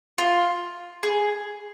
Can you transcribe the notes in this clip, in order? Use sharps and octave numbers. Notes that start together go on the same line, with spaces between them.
F4
G#4